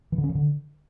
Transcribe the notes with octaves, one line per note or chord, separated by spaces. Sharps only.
E3
D3
C#4
D#3
D3